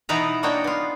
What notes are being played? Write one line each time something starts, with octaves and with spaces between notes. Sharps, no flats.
B2 E3 B3 D#4 B4 A#5
A#3 D4 D#4 F#4 C#5 G5
B3 F4